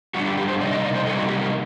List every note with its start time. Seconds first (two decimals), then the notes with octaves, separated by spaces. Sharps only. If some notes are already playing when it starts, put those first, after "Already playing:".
0.14 D3 G3 D4 F#4
0.26 G4
0.37 G4
0.48 C5
0.61 C3 G3 A#3 D#4 D5
0.73 D#5
0.84 D5
0.95 C5
1.07 C3 G3 A#3 D#4 A4
1.19 F#4
1.29 G4
1.41 A#4